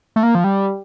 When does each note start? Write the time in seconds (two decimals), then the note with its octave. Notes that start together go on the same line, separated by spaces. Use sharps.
0.16 A3
0.23 A#3
0.35 F3
0.44 G3